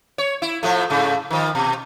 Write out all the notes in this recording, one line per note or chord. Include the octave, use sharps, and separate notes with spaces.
C#5
E4
A2 F3 A3
G#2 C#3 A3
D#3 F3
B2